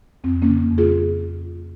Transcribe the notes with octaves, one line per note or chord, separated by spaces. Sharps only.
F2 C4
A#3 C#4
C#3
F2
F4 G#4